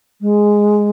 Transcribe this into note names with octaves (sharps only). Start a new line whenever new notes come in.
G#3